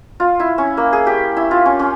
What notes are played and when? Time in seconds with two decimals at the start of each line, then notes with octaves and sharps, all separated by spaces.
0.20 F4
0.40 E4
0.58 C#4
0.77 A#3
0.93 G#4
1.07 G4
1.37 E4
1.51 F4
1.65 C#4
1.79 C#4